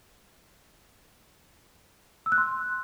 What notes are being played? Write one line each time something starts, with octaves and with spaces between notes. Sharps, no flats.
E6
F#6
C6